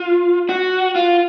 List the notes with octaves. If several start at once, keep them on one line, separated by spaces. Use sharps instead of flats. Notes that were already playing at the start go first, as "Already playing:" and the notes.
Already playing: F4
F#4
F4